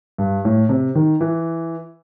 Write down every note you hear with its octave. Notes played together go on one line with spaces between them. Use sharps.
G2
A2
C3
D#3
E3